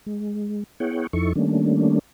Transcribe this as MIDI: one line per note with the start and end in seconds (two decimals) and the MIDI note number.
0.06 0.64 56
0.80 1.07 59
0.80 1.07 64
0.80 1.07 68
0.80 1.07 73
0.80 1.07 78
0.80 1.07 79
1.13 1.33 41
1.13 1.33 53
1.13 1.33 63
1.13 1.33 64
1.13 1.33 69
1.13 1.33 85
1.35 1.99 51
1.35 1.99 55
1.35 1.99 57
1.35 1.99 58
1.35 1.99 61
1.35 1.99 62